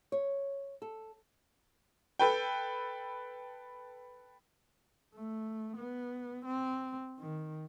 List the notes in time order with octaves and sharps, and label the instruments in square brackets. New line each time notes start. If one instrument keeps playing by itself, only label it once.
[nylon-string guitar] C#5
A4
[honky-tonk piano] A4 B4 G5
[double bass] A3
B3
C4
D#3